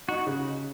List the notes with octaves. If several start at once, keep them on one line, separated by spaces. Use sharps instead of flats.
D#4 F#4
C#3